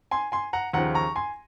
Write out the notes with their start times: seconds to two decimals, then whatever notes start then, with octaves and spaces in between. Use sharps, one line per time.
0.11 G#5 C6
0.32 G#5 C6
0.53 F#5 A#5
0.73 D#2 C#3 F3 F#5 A#5
0.95 A#5 C#6
1.16 G#5 C6